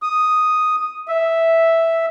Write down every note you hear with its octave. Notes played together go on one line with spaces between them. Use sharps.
D#6
E5